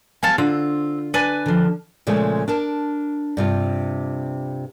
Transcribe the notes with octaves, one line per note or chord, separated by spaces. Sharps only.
G3 B3 A4 F5 G#5
D3 C4 F4
D4 B4 G#5 A5
D3 F3
A#2 C#3 F3 G#3 A3
D4 A#4 A5
G2 C3 F4